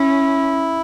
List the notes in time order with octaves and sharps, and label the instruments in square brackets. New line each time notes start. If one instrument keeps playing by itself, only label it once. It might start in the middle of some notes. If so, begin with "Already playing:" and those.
Already playing: [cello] C#4 [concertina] E4